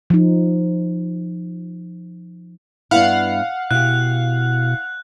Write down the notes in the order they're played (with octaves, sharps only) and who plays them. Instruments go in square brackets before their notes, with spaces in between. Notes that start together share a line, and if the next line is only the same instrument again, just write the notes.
[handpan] F3 D#4
[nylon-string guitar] G2 B3 E4 [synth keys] F5 F#5
[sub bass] B2 [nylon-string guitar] E4 G4 [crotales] F#6